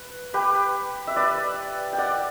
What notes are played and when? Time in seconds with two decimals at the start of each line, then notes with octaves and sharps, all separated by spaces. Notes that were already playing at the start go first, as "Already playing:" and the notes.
Already playing: B4
0.34 G4 B4
1.07 E5
1.16 B4 D5
1.93 G5
1.98 D5 F#5